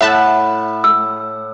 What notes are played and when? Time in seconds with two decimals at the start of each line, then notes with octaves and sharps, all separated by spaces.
0.01 A2 E5 F#5 A5 B5 F#6
0.84 E6